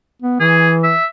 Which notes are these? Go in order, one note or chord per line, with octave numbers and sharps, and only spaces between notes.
B3
E3 G#4
E5